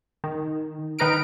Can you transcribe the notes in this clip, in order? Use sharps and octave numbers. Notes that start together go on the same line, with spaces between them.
D#3
D#3 D#4 B4 A#5 F6 D7